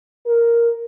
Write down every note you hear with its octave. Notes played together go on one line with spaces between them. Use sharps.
A#4